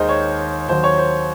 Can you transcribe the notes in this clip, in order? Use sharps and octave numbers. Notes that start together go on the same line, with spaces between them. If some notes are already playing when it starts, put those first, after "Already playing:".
Already playing: D#2 D#3 G#3 C5 D#5
C#5
D#2 D#3 F#3 C5
C#5
C5